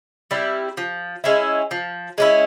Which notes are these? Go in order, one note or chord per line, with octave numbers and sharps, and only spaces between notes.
G3 C4 E4
F3
G#3 C#4 E4
F3
G#3 C#4 E4